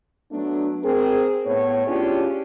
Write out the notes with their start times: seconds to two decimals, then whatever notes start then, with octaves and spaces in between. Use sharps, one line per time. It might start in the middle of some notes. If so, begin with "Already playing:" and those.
0.32 F#3 A3 B3 D4
0.84 C4 G#4 A#4
1.46 A2 B3 C#5
1.86 C#4 D4 E4 F4 G4 G#4